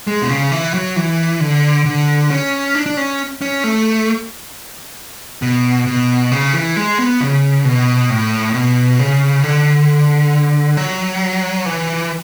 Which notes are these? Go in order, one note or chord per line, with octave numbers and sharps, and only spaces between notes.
G#3
B2
C#3
E3
F#3
E3
D3
D3
C#4
D4
D4
C#4
C#4
A3
B2
B2
C#3
E3
G#3
B3
C#3
B2
A2
B2
C#3
D3
F#3
E3